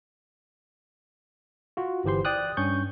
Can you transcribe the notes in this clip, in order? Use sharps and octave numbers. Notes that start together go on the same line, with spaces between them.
F4 F#4
G1 E3 G4 C5 C6
D5 G5 D#6 F#6
G2 C#4 C#6 G6